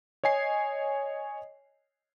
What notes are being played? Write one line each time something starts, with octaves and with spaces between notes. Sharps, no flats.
C#5 D#5 G#5 C7